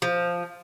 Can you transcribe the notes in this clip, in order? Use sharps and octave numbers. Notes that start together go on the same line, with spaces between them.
F3